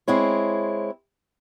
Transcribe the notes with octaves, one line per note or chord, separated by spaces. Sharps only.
G#3 C4 E4 C#5